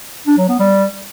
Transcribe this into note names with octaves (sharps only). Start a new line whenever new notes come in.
D4
F#3
B3
G3